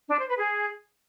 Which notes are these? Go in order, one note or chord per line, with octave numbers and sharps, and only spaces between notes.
D4
C5
B4
G#4